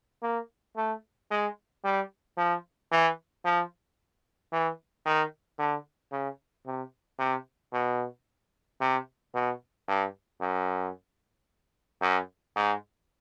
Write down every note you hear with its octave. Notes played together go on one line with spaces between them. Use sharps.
A#3
A3
G#3
G3
F3
E3
F3
E3
D#3
D3
C#3
C3
C3
B2
C3
B2
G2
F#2
F#2
G#2